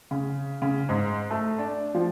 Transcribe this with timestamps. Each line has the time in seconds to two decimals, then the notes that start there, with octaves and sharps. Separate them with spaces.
0.11 C#3
0.62 C#3
0.89 G#2
1.30 A3
1.59 D4
1.95 F3